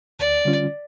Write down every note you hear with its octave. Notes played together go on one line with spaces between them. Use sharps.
D2 D5
D3 G3 C#4 F4